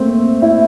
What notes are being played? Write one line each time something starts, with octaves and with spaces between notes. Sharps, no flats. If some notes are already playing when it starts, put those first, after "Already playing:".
Already playing: A3 A#3 C4
E4